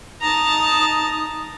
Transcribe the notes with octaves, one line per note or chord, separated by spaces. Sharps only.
D#4 A5 A#5 D#6